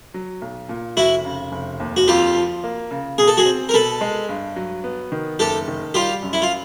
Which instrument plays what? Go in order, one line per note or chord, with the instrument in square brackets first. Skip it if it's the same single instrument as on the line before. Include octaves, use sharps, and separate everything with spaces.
[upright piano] F#3
B1
A#2
[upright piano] F1 [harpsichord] E4 F#4
[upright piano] C#3
F1
D#2
[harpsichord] F#4
[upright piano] F2 [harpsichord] F4 G4
[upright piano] F3
A#3
C#3
[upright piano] B2 [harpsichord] G#4
[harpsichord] A4
F#4 G#4
[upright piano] C4
[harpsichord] A#4
[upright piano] B2 [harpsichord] A4 B4
[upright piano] G#3
G2
F#3
B3
D#3
[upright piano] F#1 [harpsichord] G4 A4
[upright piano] D#3
[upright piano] G3 [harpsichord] F4 G4
[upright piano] F#2
[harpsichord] E4
F4